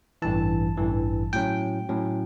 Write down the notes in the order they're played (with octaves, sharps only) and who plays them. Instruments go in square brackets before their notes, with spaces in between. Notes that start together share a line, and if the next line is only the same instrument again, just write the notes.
[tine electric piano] A1 G2 E3 A5
A1 G2 E3
A2 F#3 C#4 G5
A2 F#3 C#4